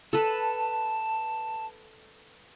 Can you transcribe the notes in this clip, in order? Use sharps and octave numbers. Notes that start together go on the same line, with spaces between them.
A4 B4 A5